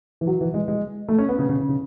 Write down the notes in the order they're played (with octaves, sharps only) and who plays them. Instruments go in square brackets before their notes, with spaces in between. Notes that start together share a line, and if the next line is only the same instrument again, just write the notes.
[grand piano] E3
F#3
E3
G#3
G#3
A3
C#4
B3
C#3
C#3
C#3